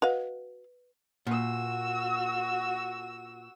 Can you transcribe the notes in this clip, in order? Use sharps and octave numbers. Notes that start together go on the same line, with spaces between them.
F#4 B4 D#5 F5
A#2 F#4 E6